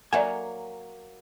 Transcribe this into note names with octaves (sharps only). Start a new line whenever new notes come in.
F#3 A#3 D5 E5 F#5 G#5